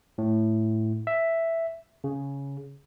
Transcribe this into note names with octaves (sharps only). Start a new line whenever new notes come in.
A2
E5
C#3